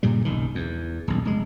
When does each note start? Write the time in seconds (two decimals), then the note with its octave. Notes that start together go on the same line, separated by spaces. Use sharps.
0.03 G2 A#2 C#3 G3
0.25 F#1 B1 D#3
0.55 E2
1.08 D#1 B1
1.25 F1 G#3